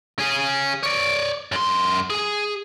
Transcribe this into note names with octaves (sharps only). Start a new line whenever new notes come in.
C#4 G#4
C#5 D5
F#2 C6
G#4